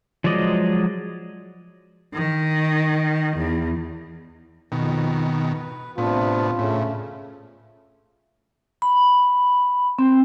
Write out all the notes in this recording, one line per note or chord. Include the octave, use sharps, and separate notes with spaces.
F3 F#3 G#3 D5 D#5
D#3
E2
F2 B2 D#3
B4
A2 C3 B3 D4 F4
A2 C#3 A3 C#4
B5
C4